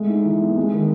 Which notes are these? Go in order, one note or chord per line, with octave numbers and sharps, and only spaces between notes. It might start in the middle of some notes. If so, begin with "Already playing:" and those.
Already playing: G#3 A3
D#4
E3
B3
G#3
D#3